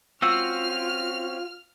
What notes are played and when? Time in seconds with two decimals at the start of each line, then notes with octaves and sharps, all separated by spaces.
0.22 C4 C#4 F4 F#4 E6 F6